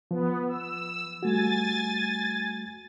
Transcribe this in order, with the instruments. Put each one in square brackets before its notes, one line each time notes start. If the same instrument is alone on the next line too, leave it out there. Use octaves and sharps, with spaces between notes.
[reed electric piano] F3 [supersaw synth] B3
[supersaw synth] E6
[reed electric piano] G3 A3 F#4 [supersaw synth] G#5 A6